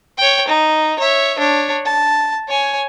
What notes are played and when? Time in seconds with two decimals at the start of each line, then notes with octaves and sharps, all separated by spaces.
0.18 C#5 G5
0.48 D#4
1.00 C#5 E5
1.39 D4 C#5
1.85 A5
2.48 C#5 G#5